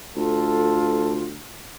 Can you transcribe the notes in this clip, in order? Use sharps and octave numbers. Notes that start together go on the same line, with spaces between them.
D2 F4 A4